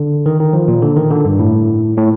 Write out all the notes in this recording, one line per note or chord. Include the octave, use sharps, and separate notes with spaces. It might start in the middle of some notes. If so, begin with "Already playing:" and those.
Already playing: D3
D#3
D#3
F3
A#2
D3
D#3
D3
G2
A2
A2